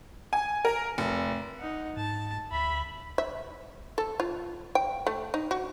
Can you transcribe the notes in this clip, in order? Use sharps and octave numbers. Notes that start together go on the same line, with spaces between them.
G#5
A#4
F1
D#4 F#5
G#2 A5
D2 E5 B5
E5
A4
F4
G5
A3
D#4
F#4